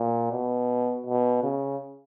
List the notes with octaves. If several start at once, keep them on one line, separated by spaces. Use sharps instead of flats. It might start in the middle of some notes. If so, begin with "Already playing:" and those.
Already playing: A#2
B2
B2
C#3